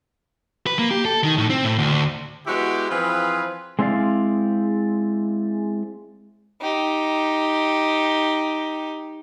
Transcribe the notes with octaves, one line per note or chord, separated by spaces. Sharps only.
B4
A#3
G4
A4
D#3
A2
C4
A2
D2
G#3 B3 E4 F#4 G4
E3 F3 C4 F4 G#4 B4
G#3 C4 E4 A4 D5 F5
D#4 G4